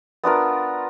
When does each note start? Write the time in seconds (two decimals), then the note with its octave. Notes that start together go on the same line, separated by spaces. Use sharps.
0.24 B3 D4 F4 A#4